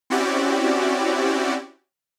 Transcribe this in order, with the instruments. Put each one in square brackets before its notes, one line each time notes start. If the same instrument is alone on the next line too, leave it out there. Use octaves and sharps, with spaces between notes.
[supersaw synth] C4 C#4 E4 F#4 G4 D5